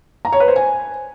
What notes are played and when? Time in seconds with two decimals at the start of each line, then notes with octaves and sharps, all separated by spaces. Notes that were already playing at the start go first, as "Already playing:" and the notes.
0.25 A#5
0.32 C#5
0.40 B4
0.48 C5
0.56 G#5